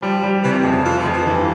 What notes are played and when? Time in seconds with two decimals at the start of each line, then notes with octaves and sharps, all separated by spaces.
0.02 F3 G3
0.23 G3
0.43 C3 E3
0.52 F3
0.58 E3
0.64 F2
0.71 C#3
0.85 E3 F4
0.98 F3
1.05 F2
1.13 E3
1.26 G2 E3